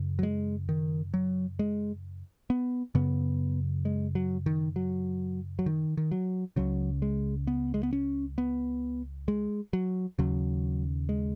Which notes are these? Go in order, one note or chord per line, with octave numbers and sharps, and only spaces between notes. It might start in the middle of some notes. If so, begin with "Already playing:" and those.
Already playing: F#2 C#3
F#3
G#3
D#3
F#3
G#3
B3
F#2 C#3 B3
G#3
F#3
D#3
F#3
F#3
D#3
D#3
F#3
C#2 C#3 F#3
G#3
B3
G#3
B3
C#4
B3
G#3
F#3
D#2 C#3 F#3
G#3